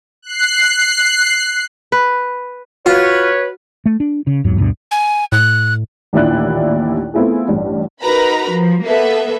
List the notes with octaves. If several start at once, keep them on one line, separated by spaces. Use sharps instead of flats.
F#6 C7
B4
F4 F#4 B4 C#5
A3
D4
C#3
F#1 E2 G#2 F#3
D2 G2 B2 D3
G#5
A2 F#6
A1 D#2 A#2 D4 E4 F#6
A3 B3 C4 E4 F4 G#4
A1 G2
D#4 F#4 A#4 B4 A#5 B5
F3
A#3 B3 A4 B4 E5